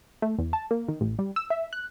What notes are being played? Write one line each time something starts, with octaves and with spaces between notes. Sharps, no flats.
A3
E2
A5
A#3
D#3
A1
G3
E6
E5
F#6